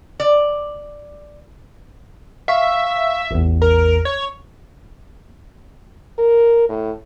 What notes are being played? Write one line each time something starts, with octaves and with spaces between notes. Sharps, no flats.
D5
E5 F5 C#6
A1 E2
A#4
C#5
A#4
A2